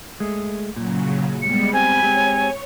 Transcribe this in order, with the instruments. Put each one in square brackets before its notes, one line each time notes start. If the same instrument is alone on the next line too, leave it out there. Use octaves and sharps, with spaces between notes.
[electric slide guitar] G#3 A3
[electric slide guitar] A#2 [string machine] C#3 F#3
[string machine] G3 G#3 B3 [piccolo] C#7
[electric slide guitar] C4 G4 [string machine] G5 B5 [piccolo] G#5
[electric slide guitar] G#3 C4 G4 [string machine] C#5